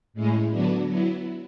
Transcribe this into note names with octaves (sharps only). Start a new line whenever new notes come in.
A2 G#3 C#4 E4
D3 F#3 B3 D4 F#4
F#3 B3 E4